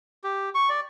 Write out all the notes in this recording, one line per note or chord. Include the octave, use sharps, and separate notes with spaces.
G4
C#6
D5